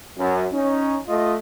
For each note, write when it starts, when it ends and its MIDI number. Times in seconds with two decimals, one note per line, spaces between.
0.18 0.45 42
0.53 0.97 61
0.53 0.97 63
1.07 1.35 57
1.07 1.35 65
1.07 1.35 75